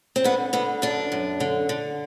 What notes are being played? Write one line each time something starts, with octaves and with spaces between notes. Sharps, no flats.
C4
D3 B3
D3 B3
F#2 D4
F#2
D3
D3